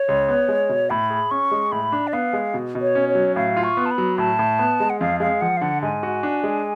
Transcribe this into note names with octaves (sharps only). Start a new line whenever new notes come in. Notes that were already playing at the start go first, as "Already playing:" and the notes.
Already playing: C#5
C#2
B3
G#3
B2
A2 B5
G#4
C#4 C#6
G#3
A2 B5
D4
D5
B3 F5
G#3
B2
B2
C#5
C#4
C#5
F#3
A2 F5
F4
C#6
B3
A5
B5
F#3
A2 A5
A2
B3
G#3
F#5
F2 F5
G#3 F5
F3 F#5
F5
D3 F#5
G#2 G#5
F#4
D4
G#3